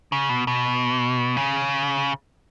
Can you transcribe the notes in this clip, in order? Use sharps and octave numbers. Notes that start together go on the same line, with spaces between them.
C#3
B2
B2
C#3